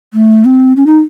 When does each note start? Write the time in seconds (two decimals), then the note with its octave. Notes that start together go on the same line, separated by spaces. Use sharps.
0.14 A3
0.45 C4
0.77 C#4
0.86 D#4